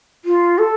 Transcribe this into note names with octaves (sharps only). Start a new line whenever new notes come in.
F4
A4